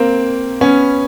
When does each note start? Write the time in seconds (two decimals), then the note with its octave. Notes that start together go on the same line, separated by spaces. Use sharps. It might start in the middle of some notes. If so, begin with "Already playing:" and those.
Already playing: A#3 C4
0.61 B3 C#4